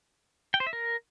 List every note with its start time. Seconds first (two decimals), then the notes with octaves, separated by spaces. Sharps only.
0.54 G5
0.60 C5
0.67 E5
0.73 A#4